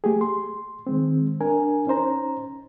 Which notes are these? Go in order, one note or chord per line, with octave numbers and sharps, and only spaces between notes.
A3 G4 G#4
C6
D#3 G#3 C4
D4 A#4 G#5
C#4 D#4 C5 A#5